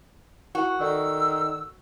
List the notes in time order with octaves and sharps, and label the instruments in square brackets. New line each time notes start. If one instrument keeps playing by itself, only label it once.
[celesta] E4 A#4 C#6 [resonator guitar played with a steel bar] F#4
[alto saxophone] D#3 [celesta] A4 D5 [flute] E6